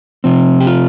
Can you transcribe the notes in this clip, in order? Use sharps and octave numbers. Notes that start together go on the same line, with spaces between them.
C3 F3 C4
G4
F4